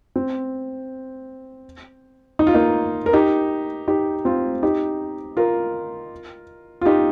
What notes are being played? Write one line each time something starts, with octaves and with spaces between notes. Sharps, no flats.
C4
D#4
F4
A#3 D#4
A#4
D#4 G4
D#4 G4
C4 F4
D#4 G4
F4 A#4
F4
D#4 G4